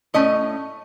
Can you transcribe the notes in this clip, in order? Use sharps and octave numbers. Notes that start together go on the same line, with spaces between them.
A2 A3 C#4 D#5